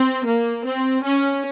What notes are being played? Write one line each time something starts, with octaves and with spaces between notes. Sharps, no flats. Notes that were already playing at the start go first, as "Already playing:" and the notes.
Already playing: C4
A#3
C4
C#4